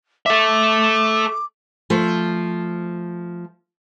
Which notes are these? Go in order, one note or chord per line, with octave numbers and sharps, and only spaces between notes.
A4 E5 D6
F3 A3